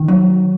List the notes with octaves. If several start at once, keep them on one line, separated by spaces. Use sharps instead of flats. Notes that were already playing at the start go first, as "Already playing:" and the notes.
Already playing: D#3
F#3